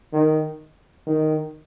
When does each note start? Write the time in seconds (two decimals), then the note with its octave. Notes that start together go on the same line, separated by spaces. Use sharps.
0.13 D#3
1.07 D#3